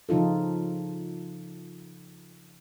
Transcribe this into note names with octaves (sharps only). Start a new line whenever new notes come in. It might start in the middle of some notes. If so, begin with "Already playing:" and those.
C#3 F3 D#4 F4 A4